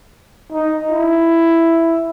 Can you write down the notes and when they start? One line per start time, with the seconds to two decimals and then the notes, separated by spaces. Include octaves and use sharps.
0.52 D#4
0.91 E4